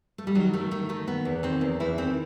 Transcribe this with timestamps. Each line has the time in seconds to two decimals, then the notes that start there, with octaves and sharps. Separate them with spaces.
0.18 A3
0.27 G3
0.35 D#3 F#3
0.53 D#3 A3
0.71 D#3 A3
0.89 D#3 A3
1.07 D#3 B3
1.25 E2
1.43 D#3 C4
1.61 E2
1.80 E2 E4
1.98 D#3 C4